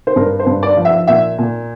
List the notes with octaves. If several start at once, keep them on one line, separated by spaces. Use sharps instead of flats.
C5
G2 A#4
C5
G2
D5
F3
E5
A#2 E5
A#2